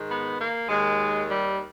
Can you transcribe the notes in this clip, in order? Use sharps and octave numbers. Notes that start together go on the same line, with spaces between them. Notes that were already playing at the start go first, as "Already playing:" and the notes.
Already playing: G#2 D#3
B3
A#3
D#2 D#3 G#3
G3